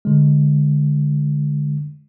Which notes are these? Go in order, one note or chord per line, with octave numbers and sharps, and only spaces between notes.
D3 G#3